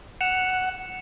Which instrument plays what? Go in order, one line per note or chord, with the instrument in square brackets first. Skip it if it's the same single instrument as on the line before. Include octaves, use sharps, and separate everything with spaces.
[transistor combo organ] F#5 [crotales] C#7 E7 F7